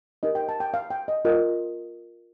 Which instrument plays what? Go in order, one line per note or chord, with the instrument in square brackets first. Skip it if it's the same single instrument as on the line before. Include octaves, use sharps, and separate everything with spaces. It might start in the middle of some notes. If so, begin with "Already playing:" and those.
[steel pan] D#4 G4 A#4 D#5
G5
A5
G5
F5
G5
D#5
F4 A#4 D#5